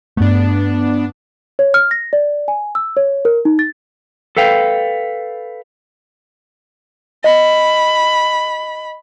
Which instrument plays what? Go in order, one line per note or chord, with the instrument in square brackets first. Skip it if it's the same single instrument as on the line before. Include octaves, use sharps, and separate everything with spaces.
[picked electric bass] G2 A3 [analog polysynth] B3 D4
[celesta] C#5
F6
A#6
D5
G#5
E6
C#5
A#4
D#4
A6
[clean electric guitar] A4 B4 F5 G5
[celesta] D#5 [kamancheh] B5